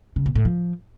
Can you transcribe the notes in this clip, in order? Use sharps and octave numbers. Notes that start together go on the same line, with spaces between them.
C#3
A#2
A2
F3